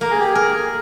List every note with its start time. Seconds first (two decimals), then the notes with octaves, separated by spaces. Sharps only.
0.01 A#3 A#4
0.11 G#4
0.20 G4
0.30 G#4
0.35 A#4